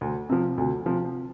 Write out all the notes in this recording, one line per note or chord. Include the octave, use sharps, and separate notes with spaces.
D2
C3 F3
D2
C3 F3